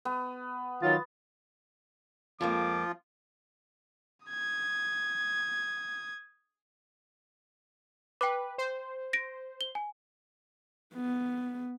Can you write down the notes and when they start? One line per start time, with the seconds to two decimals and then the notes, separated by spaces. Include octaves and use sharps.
0.05 B3
0.82 D#3 F#3 F4 A6
2.41 F2 F3 G#3 A#3 F4 D6
4.26 D#6 G#6
8.21 B4 G5 D6
8.58 C5
9.13 A#6 D7
9.61 G7
9.75 G#5
10.94 B3